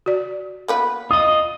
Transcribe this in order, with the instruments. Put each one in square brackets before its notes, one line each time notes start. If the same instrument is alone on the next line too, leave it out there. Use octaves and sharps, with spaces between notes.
[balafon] F#4 D5
[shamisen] A#3 B3 B4
[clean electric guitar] F4 D#5 [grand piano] D#6